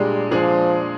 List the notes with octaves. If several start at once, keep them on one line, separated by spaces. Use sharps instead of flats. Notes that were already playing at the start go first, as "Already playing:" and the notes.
Already playing: A#2 G3 G#3 D4 G#4
A#2 F3 G#3 D4 G#4